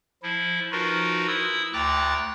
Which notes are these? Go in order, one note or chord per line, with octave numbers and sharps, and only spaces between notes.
F3 E4
F3 D#4 F4 F#4 A#4 B4
E4 D#6 E6
D2 G5 A#5 D6 F#6 A6